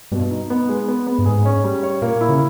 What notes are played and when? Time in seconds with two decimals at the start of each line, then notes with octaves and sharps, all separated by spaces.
0.12 G2 B2
0.31 D#4
0.50 B3
0.69 G#3
0.88 B3
1.07 B3
1.19 G2
1.25 G#2 G#4
1.45 C#4
1.64 G3
1.83 C#5
2.02 A#2 A#3
2.21 E4
2.29 C#3